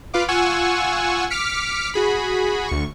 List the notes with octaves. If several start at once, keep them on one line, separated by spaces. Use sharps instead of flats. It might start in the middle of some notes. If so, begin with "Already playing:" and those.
F4 B4 F5 D6
F4 F#5 G#5 C#6 E6
D6 F6 B6 C#7
F#4 G#4 B5
D2 C#6